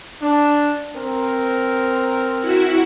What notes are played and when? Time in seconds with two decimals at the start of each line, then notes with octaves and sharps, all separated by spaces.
0.21 D4
0.96 C4 A#4
2.40 E4 F#4